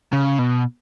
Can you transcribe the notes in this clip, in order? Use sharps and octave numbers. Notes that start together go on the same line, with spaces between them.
C#3
B2